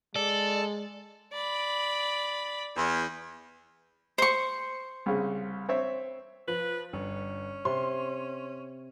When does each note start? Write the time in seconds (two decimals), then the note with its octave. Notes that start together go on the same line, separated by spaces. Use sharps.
0.16 G#3 A4 D5
1.32 D5 B5
2.76 E2
4.18 C5 C#6
5.06 C2 C#3
5.69 C4 C#5 E5
6.48 F3 B4
6.93 G1 C#4
7.65 C3 C6